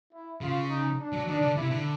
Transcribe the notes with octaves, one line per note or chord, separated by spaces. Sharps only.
E4
C#3 F4
D#4
D4
F#3
D#3 D4
D3
C3 E4
D3